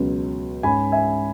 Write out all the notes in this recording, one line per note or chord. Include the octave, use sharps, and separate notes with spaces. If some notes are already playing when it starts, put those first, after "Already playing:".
Already playing: C#2 B2 F#3
G#2 G#3 C#4 G#5 B5
E5 G#5